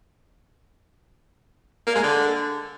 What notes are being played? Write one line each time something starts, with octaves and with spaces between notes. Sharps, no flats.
A#3
G#3
D3